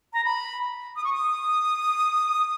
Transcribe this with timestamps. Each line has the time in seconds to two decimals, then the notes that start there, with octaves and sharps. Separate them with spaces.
0.13 A#5
0.24 B5
0.96 D#6
1.04 C#6
1.13 D#6